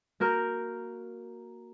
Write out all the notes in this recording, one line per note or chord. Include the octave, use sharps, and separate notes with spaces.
A#3 F#4 A#4 F6 G6